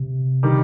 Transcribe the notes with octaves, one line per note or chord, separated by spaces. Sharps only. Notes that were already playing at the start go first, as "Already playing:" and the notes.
Already playing: C3
D#3 G3